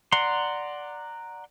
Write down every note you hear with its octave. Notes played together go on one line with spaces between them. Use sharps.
D5 F#5 A#5 C6